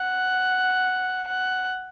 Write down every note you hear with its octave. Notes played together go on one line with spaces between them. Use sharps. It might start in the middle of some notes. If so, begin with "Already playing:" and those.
Already playing: F#5
F#5